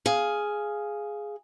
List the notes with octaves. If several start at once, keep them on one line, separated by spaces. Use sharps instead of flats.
G#4 F5